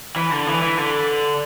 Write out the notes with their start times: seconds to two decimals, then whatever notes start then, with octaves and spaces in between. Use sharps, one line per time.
0.16 E3
0.31 D3
0.47 E3
0.62 E3
0.77 D3